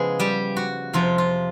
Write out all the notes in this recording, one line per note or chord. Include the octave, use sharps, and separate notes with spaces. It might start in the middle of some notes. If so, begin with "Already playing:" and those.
Already playing: C#3 F3 G#3 B3 E4 G#4
G3 G4
F#4
F2 C3 F3 F4
F4